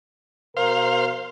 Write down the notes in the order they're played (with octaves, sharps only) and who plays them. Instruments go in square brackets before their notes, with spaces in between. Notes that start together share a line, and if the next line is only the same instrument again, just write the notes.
[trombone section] B2 A#4 [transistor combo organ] C5 F5